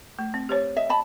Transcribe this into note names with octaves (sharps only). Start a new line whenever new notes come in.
A3
C4
G4 C5 C#5
D#5 E5
D#5 A5 B5